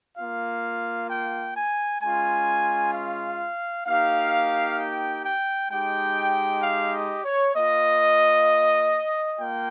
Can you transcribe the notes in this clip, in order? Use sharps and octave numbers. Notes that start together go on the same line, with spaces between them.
A#3 F4 F5
G5
G#5
G#3 C#4 F4 G#5
F5
A#3 D#4 G4 F5
G5
G5
G#3 D#4 G4 G5
F5
D#5
C#5
A#3 F4 D#5
A#3 F4 G5